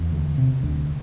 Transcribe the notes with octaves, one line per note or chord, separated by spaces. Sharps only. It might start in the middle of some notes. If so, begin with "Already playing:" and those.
Already playing: E2
D2
C3
D2